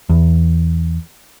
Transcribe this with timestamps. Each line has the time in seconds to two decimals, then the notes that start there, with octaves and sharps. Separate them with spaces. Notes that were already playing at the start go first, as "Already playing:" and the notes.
0.09 E2